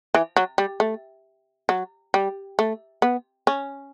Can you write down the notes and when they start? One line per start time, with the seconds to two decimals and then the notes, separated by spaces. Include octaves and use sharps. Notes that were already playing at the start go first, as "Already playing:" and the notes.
0.14 E3
0.36 F#3
0.58 G3
0.80 A3
1.69 F#3
2.14 G3
2.59 A3
3.02 B3
3.47 C#4